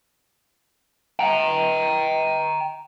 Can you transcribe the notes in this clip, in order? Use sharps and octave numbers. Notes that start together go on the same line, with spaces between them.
G5 A#5